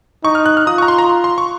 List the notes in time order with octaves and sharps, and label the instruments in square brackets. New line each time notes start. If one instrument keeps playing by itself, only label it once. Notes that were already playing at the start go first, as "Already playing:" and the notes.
[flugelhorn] D#4 [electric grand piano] C#6
[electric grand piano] F6
F#6
F6
[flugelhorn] F4 [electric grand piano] D#6
[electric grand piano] C#6
A#5
C6
A#5
C6
C6
C#6